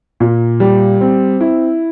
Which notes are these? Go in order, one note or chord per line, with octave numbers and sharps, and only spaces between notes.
A#2
G3
C4
E4